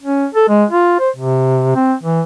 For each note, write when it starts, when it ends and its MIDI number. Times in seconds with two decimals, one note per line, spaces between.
0.02 0.26 61
0.34 0.47 69
0.48 0.65 56
0.71 0.98 65
1.00 1.10 72
1.16 1.70 48
1.75 1.94 60
2.03 2.22 52